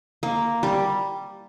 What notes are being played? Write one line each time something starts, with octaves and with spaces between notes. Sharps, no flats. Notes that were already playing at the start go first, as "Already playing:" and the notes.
A#3
G3